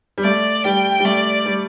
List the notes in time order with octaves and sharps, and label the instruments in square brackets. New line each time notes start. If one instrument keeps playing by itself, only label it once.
[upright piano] G3
[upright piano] A3 [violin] D5
[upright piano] G3 [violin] G5
[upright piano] G3
[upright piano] A3 [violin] D5
[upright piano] G3